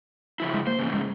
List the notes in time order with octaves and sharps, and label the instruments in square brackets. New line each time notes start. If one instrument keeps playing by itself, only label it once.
[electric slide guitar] C#3 F3 E4
[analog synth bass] G#3
[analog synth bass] A#3 [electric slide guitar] C5
[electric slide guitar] G#2 C#3 E3
[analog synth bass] G#3